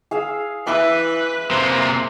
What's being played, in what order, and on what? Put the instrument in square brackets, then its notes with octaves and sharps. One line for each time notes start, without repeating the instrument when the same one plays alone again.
[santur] G#4 F5 E6
[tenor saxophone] E3 [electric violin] B4 [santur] E5 B5 D6
[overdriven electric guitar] C3 A#3 [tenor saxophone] C5